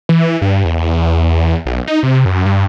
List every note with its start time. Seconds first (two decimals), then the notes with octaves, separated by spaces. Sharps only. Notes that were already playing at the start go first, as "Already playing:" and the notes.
0.09 E3
0.42 G2
0.65 E2
1.66 B1
1.87 D#4
2.03 C3
2.25 F#2
2.45 G2